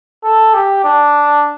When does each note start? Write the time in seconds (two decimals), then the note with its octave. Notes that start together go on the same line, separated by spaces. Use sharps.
0.24 A4
0.54 G4
0.84 D4